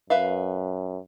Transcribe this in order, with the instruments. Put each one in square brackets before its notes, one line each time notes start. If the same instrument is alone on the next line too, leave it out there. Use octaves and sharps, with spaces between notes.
[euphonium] F#2 [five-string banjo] B4 E5 F5